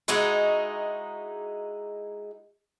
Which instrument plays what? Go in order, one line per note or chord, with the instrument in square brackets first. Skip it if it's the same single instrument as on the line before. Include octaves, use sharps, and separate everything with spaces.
[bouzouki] G#3 D#4 E4 F#4